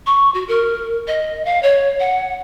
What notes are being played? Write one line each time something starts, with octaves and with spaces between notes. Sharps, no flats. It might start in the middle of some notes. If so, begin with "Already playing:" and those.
C#6
F#4
A#4
D#5
F5
C#5
F#5